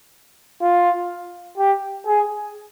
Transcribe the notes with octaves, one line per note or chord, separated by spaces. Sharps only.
F4
G4
G#4